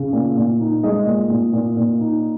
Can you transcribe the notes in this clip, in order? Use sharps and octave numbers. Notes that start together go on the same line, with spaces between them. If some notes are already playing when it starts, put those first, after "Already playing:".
Already playing: C#3
A#2
A#2
D#4
G#3 D#5
A#2
A#2
A#2
A#2
D#4